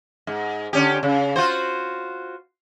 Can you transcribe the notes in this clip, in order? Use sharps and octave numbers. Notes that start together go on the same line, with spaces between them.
G#2
D3 C#4 G4
C#3
F4 F#4 C5